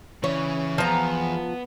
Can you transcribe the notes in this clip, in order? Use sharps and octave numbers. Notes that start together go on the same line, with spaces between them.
C#3 E3 C#5
E2 F3 B3 A#5